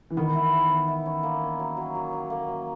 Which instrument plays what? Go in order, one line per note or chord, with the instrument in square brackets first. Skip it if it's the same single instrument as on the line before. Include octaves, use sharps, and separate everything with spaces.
[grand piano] E3
[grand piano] D#3 [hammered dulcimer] B3
[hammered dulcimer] E4
E4
B3
E4
C#4
A#3
C#4
F#3
F#3
F#4
F#3
A#3
F#3